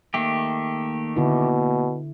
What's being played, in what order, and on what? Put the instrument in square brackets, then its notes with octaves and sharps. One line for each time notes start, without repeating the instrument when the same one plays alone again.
[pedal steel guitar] D#3 A3 G4 [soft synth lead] A#3
[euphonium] B2 [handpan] D3 E4